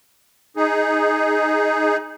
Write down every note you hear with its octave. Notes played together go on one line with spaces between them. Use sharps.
D#4 G#4